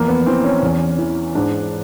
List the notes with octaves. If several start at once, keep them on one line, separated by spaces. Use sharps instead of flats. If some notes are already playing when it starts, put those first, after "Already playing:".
Already playing: E2 F3 A#3
B3
E3 C4
C#4
E2
E3
G#2 D4